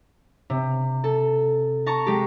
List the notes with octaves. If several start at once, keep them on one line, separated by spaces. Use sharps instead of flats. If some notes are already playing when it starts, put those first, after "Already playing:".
C3
A4
A5 A#5 C#6
G#3 G4